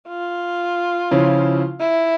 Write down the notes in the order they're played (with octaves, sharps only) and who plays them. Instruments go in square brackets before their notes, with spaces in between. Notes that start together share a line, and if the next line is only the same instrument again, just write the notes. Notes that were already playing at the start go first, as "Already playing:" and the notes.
[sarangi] F4
[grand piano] C#3 F3 C#4 E4
[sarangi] E4